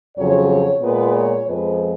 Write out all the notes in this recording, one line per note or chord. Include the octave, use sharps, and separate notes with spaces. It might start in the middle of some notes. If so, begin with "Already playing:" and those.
F2 C#3 F#3 C#5
A#2 G#3 B3 B4
C#5
F2 F3 G#3 B3 B4